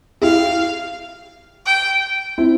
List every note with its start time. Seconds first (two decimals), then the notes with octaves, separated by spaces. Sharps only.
0.22 E4 G4 F5
1.66 G5
2.38 C4 E4